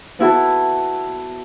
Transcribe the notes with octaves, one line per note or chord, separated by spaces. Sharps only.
B3 E4 F#4 A4